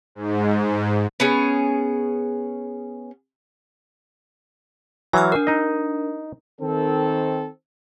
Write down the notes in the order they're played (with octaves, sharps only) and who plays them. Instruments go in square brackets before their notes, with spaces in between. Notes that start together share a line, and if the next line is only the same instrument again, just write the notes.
[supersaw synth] G#2
[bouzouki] B3 C#4 G#4
[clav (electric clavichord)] E3 F#3 [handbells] G#5 E6 F6
[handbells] D4 A#4
[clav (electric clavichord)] D#4 D#5
[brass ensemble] D#3 C4 A4